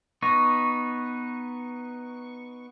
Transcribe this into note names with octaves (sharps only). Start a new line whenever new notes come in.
B3 D#4 C#6